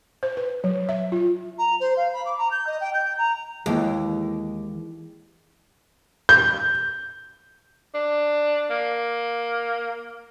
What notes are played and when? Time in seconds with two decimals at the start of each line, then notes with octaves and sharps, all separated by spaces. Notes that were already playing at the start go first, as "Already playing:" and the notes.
0.23 C5
0.37 B4
0.64 F#3
0.89 E5
1.12 F4
1.58 A#5
1.80 C5
1.96 F5
2.13 B5
2.25 D6
2.38 A#5
2.51 G6
2.66 D#5
2.80 G5
2.93 G6
3.17 A#5
3.66 D#2 E3 G#3
6.29 G6
7.94 D4
8.70 A#3